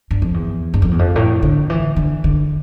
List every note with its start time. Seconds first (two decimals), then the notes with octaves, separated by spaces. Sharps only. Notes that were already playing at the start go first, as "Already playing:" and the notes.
0.11 G2
0.22 F2
0.34 E2
0.74 G2
0.82 F2
0.91 E2
0.99 F2
1.16 A2
1.43 D3
1.70 E3
1.96 D3
2.24 D3